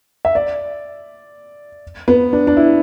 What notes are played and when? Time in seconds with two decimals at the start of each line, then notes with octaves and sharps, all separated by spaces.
0.25 E5
0.35 D5
2.08 B3
2.33 D4
2.47 D4
2.57 E4